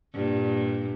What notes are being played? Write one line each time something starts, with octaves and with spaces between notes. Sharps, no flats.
G2 A#2